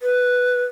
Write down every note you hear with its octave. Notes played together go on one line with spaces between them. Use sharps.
B4